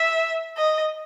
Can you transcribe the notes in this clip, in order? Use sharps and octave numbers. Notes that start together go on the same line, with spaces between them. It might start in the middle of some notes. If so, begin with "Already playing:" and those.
Already playing: E5
D#5